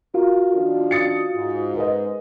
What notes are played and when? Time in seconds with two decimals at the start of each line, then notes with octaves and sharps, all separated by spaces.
0.14 F4 F#4 A#4 F5
0.54 D#3 F3 D4
0.91 D#6 A6 C#7
1.35 G#2
1.76 A#4 B4 D#5